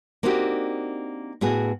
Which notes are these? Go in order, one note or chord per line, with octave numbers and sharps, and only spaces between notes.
A#3 C4 D4 D#4 F#4 G4
A2 B3 F#4 G#4